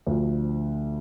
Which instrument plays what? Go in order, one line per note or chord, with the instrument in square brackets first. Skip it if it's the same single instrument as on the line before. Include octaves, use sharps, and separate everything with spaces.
[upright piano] D2 D3 F3